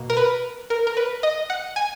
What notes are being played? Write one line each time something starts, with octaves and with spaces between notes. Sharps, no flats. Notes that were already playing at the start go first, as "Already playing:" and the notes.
Already playing: B2 A#3
A#4
B4
A#4
A#4
B4
D#5
F#5
G#5